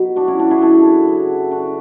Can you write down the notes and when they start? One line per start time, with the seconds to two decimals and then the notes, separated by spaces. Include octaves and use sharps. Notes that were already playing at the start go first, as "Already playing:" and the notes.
Already playing: B2 F#3
0.16 D4 F#4
0.28 C#4 E4
0.39 D4 F#4
0.51 E4 G#4
0.61 F#4 A4
1.06 C#3 F#3
1.51 D4 F#4